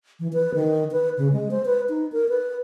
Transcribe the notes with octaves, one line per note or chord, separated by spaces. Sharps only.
E3
B4
D#3
B4
C#3
G#3
C5
B4
D#4
A#4
B4